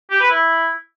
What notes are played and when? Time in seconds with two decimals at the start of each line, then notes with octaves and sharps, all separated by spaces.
0.11 G4
0.20 B4
0.30 E4